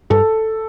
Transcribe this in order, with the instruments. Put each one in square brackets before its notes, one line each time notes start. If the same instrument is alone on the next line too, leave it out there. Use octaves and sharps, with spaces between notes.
[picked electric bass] G2 [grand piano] A4